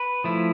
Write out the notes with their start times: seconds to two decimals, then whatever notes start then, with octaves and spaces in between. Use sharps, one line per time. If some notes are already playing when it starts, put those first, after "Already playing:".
Already playing: B4
0.24 F3 A3 E4